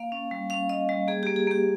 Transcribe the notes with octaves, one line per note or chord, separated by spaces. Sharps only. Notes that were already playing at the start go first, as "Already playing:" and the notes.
Already playing: A#3 F5
C#4
G3
C#4 F5
C#4 D#5
G3
A#3 G#4
G4
A#3
G#4
A#3 G4